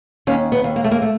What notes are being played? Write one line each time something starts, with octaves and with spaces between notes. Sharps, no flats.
D#2 C#4
B3
D#2
A#3
A3
A#3
A3